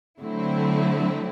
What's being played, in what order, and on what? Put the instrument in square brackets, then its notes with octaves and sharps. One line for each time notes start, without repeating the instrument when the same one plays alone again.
[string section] D3 F#3 A3 C4 E4